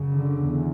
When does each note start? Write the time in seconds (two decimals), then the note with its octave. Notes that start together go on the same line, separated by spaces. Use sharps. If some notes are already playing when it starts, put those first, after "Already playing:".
Already playing: F#2 C#3
0.10 D3
0.42 E2